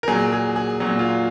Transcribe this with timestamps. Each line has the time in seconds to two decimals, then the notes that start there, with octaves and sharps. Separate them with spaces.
0.03 A#4
0.08 A#2 F#3 G#4
0.32 G#4
0.56 G#4
0.80 A#2 F#3
0.99 F4